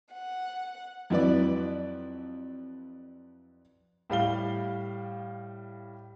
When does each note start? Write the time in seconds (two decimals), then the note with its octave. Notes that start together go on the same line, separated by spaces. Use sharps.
0.13 F#5
1.10 F2 F#3 E4 B4 D5
4.10 A2 G3 F5 G7